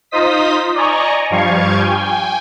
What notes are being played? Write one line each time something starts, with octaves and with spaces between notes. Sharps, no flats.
D#4 F4 C5 D#5 D#6 B6
D5 D#5 G#5 A#5 C#6
G2 F3 G3 F5 C#6 G#6
G5 G#5